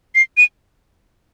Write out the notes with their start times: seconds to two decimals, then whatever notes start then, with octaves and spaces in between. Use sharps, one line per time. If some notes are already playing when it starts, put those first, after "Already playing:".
0.15 C7
0.37 D#7